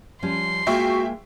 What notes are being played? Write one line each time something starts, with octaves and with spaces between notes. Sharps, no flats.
F3 G3 C#4 C6
G#3 A#3 F4 F#4 E5 G5 C#6